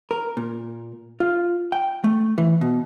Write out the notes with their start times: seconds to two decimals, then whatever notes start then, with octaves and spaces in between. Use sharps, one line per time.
0.11 A#4
0.37 A#2
1.20 F4
1.72 G5
2.04 A3
2.38 E3
2.61 B2